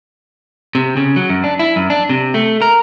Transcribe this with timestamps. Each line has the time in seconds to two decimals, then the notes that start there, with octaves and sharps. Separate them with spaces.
0.75 C3
0.97 C#3
1.16 F#3
1.29 F#2
1.44 D4
1.59 E4
1.76 F#2
1.90 D4
2.09 C3
2.34 A3
2.62 A#4